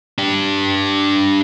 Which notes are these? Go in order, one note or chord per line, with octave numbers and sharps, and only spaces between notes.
D4 G4